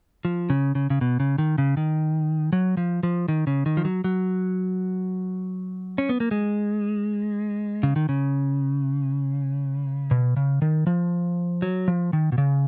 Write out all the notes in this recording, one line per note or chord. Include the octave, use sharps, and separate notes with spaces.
F3
C#3
C#3
C#3
B2
C#3
D#3
C#3
D#3
F#3
F3
F3
D#3
C#3
D#3
F3
F#3
F#3
C#4
B3
A#3
G#3
C#3
D#3
C#3
B2
C#3
D#3
F3
F#3
F3
D#3
B2
C#3